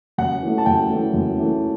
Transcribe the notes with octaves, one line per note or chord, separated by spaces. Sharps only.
F#2 F#5
E3 A3
A5
F#2 G5
E3 A3
F#2
E3 A3